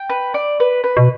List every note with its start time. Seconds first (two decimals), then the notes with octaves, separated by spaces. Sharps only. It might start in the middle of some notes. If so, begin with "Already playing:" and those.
Already playing: G5
0.09 B4
0.34 D5
0.60 B4
0.84 B4
0.97 B2